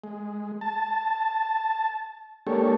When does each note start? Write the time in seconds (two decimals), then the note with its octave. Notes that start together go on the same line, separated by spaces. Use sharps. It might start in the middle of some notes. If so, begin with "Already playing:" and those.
0.04 G#3
0.61 A5
2.47 G#3 A#3 D4 G4 A4 C#5